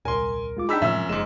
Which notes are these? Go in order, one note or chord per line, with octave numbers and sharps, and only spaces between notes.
D#1 C2 A#4 G#5 C6
G#3 F4 D6
D4 D#4 G#4 G5 B5 E6 B6
F#2 A2 C3 F3 G#3 C#4 E5 E6
F#1 G#2 G#3 E7